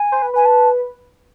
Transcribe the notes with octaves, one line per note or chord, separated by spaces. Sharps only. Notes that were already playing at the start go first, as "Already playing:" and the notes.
Already playing: G#5
C5
B4
B4 G#5
A5